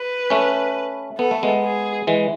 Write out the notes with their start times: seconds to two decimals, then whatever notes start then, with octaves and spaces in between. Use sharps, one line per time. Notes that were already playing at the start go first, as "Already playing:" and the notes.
Already playing: B4
0.30 A3 C#4
1.19 B3 A4
1.31 A3
1.43 G#3 B3
1.64 G#4
2.07 E3 G#3